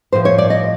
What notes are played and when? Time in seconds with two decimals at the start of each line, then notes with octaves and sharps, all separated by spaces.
0.12 A2 F3 C5
0.25 C#5
0.38 D5
0.50 D#5